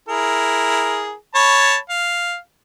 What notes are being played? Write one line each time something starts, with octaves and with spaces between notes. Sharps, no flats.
E4 G#4 A#4
C#5 A5 B5
F5